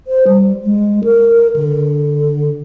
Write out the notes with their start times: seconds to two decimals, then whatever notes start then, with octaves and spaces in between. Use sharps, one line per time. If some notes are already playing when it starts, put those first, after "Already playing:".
0.07 C5
0.27 G3
0.64 G#3
1.04 A#4
1.56 D3